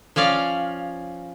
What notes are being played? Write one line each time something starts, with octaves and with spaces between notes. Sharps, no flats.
F3 C#4 D5 F5